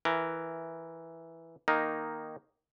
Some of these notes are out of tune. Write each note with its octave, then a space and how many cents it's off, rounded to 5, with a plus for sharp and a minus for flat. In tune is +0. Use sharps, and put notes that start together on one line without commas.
E3 +0 A#4 +0
D#3 +0 A#3 +0 D#4 -5